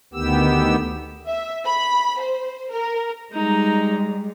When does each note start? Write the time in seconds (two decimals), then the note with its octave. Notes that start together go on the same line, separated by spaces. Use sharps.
0.13 D2 D#3 B3 G4 E6
1.27 E5
1.65 B5
2.20 C5
2.70 A#4
3.33 G3 G#3 D#4 A#5